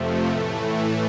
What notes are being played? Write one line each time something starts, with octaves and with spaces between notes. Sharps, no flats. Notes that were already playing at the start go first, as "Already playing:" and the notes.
Already playing: F2 C3 F3 A3
A2 E3 A3